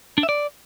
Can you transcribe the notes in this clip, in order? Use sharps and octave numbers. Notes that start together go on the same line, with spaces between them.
D4
E5
D5